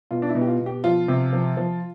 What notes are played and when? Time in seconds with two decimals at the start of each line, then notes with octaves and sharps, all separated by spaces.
0.11 B2 F4
0.22 D4
0.29 E4
0.35 B2
0.41 G4
0.47 F4
0.60 B2
0.66 G4
0.84 F3 F4
1.08 C3
1.33 F3
1.57 F3